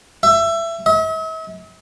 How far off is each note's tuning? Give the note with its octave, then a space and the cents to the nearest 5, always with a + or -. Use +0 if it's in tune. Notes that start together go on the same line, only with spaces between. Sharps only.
E5 +20
E5 -45